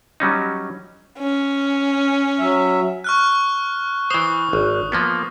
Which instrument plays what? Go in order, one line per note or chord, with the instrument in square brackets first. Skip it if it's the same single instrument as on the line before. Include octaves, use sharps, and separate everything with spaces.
[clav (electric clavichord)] F#3 G3 C#4 D#4
[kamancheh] C#4
[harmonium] F#3 E5
[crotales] C#6 F6 F#6
[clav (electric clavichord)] E3 C5 [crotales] D#6
[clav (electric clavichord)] G#1
F3 A#3 B3